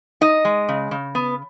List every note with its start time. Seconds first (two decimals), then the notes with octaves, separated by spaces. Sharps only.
0.21 D#4 D#5
0.45 G#3
0.69 C#3
0.91 C#3
1.15 B3